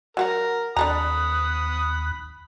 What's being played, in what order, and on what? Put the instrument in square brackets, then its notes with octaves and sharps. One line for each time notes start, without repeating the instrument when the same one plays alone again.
[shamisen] F#3 F#4 F#5 [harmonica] A#4
[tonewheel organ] D#2 F#6 [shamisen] D4 A4 A#5 [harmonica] B5 D#6